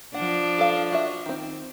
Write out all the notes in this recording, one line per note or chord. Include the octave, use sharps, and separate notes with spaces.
F3 D4 F#5
A4 F5
F#4 E5
D#3 C4